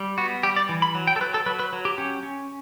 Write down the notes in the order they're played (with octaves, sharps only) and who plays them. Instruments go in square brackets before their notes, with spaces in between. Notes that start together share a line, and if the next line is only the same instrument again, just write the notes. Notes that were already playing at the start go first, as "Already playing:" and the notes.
Already playing: [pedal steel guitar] G3
B3 F#4
G3 G4
D5
E3
B5
F#3
G5
A4
F#3 B4
A4
F#3 B4
B4
F#3
G4
C#4 G4
C#4